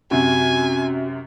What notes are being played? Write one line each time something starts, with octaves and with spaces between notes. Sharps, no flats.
F#2 C3 F#4 G#5